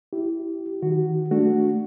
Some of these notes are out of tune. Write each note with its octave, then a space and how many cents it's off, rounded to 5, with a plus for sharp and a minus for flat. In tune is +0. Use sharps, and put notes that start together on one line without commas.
E4 +0 G4 -20
D#3 +20 F#4 +5
A3 +0 D4 +0 F#4 +0